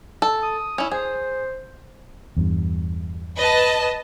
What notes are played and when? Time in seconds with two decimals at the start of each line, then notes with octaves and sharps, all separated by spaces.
0.22 A4
0.42 D#6
0.78 C#4 E4
0.91 G#4 C5
2.37 E2 G2
3.38 B4 D#5 A5